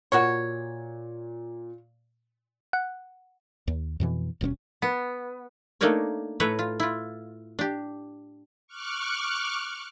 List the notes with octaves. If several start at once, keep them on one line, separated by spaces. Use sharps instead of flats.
A#2 F#4 A#4 C#5
F#5
D#2
F2 B2 E3
D#1 B2 A#3 C#4
B3
A3 A#3 D4 D#4 A#4 C#5
A2 A3 B4 C#5 A#5
F4
E4 F4
D4 G4
C#6 D6 F6 F#6